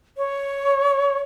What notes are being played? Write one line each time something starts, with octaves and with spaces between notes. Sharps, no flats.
C#5